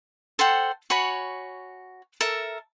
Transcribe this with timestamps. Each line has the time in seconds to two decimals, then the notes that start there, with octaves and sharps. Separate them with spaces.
0.39 A4 C5 F#5 G5
0.90 F#4 C#5 G#5 B5
2.21 A4 A#4 E5